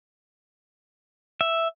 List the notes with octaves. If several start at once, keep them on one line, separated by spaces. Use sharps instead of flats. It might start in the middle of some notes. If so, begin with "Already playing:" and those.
E5